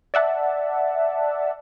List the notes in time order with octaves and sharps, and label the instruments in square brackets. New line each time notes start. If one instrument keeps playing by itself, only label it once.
[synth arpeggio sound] D5 E5 F#5 A5